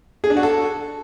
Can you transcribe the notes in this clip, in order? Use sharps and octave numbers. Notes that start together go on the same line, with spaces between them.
G#4
D4
F#4
A4